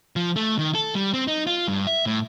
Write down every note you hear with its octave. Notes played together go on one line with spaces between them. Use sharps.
F3
A3
D#3
A4
G3
C4
D#4
F4
G2
E5
A2